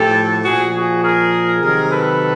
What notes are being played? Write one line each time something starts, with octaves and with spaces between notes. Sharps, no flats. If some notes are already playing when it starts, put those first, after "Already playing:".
Already playing: A2 F3 G4 A4
A#2 F3 F#4 G#4
F#4 G#4
G#4 A#4
C3 D#3 F#3 G#4 A#4
A4 B4